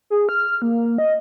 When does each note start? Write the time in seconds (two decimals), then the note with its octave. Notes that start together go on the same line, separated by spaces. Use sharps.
0.10 G#4
0.29 F6
0.62 A#3
0.98 D#5